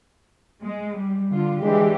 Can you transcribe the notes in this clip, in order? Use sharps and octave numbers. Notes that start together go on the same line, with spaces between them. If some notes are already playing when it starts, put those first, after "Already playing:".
G#3
G3
D3 F4
E3 G#3 D4 G4